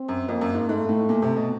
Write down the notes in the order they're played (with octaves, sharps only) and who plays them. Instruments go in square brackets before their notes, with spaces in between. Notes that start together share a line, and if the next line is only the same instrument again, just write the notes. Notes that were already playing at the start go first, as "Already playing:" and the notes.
Already playing: [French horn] C4
[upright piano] F#2
[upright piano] F2 [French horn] A#3
[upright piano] F#2
G#2
[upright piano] G#2 [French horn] A3
[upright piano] A2
A#2
C3
B2